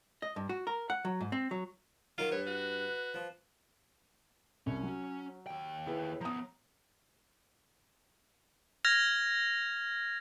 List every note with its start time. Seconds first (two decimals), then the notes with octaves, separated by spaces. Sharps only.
0.22 D#5
0.36 G2
0.49 F#4
0.67 A#4
0.90 F#5
1.05 F#3
1.21 G#2
1.32 C4
1.51 F#3
2.18 D#3 F#3 F4 A#4
2.32 G2 B4 C#5
2.46 F#4
3.14 F3
4.67 C2 C#4
4.83 F#3
5.47 D#2 G5
5.86 E4 G#4 B4
6.21 F3 B3 A#5 D#6
8.85 F6 G#6 A#6 F7